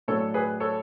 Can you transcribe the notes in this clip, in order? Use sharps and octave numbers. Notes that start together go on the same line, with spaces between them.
A2 F#3 A3 D4 A4 C#5
G#4 B4
A4 C#5